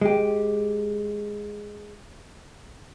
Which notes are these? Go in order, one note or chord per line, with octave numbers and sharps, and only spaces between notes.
G#3 G4